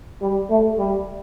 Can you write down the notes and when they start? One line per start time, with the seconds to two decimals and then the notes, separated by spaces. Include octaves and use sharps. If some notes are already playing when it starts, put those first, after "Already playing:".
0.22 G3
0.50 A3
0.79 G3